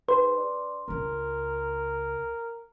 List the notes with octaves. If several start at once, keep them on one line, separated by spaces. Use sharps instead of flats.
G#2 B4 C6
D4
C#2 D4 A#4